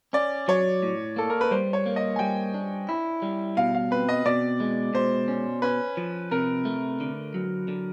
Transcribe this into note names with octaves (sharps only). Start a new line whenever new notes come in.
C#4 D5
F#3 C#5
A2
A#3 A4
A#4
B4
G3 C5
C#5
A#3
D#5
G#5
G3 G5
D4
E4
G3
B2 F5
F5
C4 B4
D#5
B2 D5
G#3
B2 C5
C#4
C#4 B4
F3
C3 A#4
A3
D3
F#3
D3